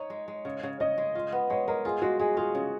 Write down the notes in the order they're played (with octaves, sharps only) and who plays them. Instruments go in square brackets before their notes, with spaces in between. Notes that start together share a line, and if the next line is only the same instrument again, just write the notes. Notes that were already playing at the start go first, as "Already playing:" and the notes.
Already playing: [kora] D#4 [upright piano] C#5
[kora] G#3
G#3
C#3
C#3
[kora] C#3 [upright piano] D#5
[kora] G#3
F4
B3
[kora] G#3 [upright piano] C#5
[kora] G#3 [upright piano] A#4
[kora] F4 [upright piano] G#4
[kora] G#3 [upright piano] F#4
[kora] G#3 [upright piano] G#4
[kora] F4 [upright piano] G#4
[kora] C#3